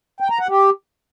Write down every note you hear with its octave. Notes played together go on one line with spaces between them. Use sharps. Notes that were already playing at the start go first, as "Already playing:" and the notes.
G5
A#5
F#5
G4